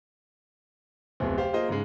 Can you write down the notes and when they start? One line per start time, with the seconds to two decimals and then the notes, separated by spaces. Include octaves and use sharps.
1.20 D1 F2 C3 B3 C4
1.37 G4 C5 F5
1.53 A#3 F4 G#4 C5 D#5
1.68 G#2 C#3 G#3